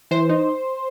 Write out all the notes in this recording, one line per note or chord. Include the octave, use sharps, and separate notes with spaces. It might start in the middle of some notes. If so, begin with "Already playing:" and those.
E3 C5
D#4